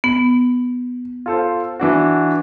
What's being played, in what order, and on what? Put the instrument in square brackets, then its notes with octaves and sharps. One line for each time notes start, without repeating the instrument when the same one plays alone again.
[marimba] B3 [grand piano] F#7
[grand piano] F4 A4 C5
E3 D4 F#4